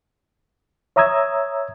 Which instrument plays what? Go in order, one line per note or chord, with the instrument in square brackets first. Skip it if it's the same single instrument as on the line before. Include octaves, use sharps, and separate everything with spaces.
[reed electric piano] C#5 E5 A#5 D#6 E6 G#6